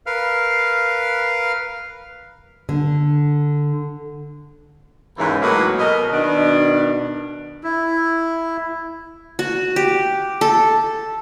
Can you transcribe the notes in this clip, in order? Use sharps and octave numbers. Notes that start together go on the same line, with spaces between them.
A#4 B4 F5 F6
D3
D#2 G#2 C#3 E3
A2 F#3 G#3 A#3 F#4 B4
B2 A#4 D#5
B2 D#3 D4
E4
F#4
G4
A4